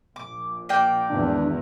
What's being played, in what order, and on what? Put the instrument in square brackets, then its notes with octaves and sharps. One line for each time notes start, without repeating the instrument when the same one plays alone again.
[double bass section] A#1 [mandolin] D6
[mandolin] A#3 D5 G5
[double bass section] G#1 E2 [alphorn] D4